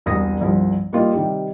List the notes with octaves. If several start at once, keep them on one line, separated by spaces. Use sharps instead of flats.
E1 C2 D#6 A#6
G1 C2 F3
G3 A#3 D#4 F4
C3 D#3 G3 G4